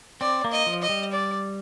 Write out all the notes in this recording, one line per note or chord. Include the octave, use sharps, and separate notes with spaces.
C4 D5
A#3
D#5
F3
D#5
G3
D5